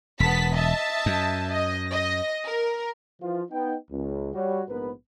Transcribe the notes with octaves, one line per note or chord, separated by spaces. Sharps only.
E1 B3 A5 B6
D#5 E5 A5
F#2
D#5
D#5 A#6
A#4
E3 F3 F4
B3 D#4 G5
C#2
G3 F#4 C#5
A#1 G#2 B3 A#4 B4